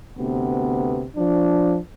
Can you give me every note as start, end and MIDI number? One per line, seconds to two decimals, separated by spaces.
0.17 1.04 38
0.17 1.04 48
0.17 1.04 59
1.16 1.77 53
1.16 1.77 62